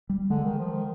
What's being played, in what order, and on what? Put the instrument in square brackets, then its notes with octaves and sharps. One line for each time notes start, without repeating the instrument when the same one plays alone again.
[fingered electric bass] G3
[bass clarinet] D3 [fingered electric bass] G#3
[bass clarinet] D#3
F3
D#3